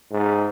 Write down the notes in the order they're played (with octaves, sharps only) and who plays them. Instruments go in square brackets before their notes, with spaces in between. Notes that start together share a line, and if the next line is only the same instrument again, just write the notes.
[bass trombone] G#2